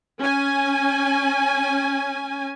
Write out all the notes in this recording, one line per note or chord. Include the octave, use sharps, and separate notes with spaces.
C#4 G#5